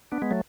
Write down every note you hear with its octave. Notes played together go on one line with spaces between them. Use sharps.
B3 D4
G#3 B3
F#3 A3